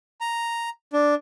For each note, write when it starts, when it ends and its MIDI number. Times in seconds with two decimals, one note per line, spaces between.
0.21 0.69 82
0.93 1.15 62